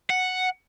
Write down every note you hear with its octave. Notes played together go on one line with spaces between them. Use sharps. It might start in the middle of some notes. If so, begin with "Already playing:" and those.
F#5